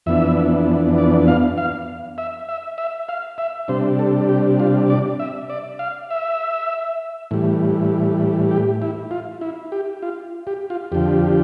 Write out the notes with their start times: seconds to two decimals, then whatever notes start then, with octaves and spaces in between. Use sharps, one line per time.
0.06 F2 E3 B3 D4 E5
0.98 D5
1.28 F5
1.58 F5
2.18 E5
2.49 E5
2.78 E5
3.09 F5
3.38 E5
3.68 C3 G3 D4 C5
3.99 A4
4.29 G4
4.60 F4
4.90 D5
5.20 E5
5.50 D5
5.79 F5
6.11 E5
7.31 A2 E3 G3
8.51 G4
8.82 E4
9.11 F4
9.41 E4
9.72 G4
10.03 F4
10.47 G4
10.70 F4
10.92 F2 D3 F3 G4